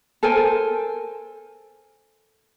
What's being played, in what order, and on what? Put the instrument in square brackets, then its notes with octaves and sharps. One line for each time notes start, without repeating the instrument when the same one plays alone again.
[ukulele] A4 A#4 C5 G#5